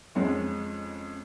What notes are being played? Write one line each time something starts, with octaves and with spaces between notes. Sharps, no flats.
F2 G#3 C#4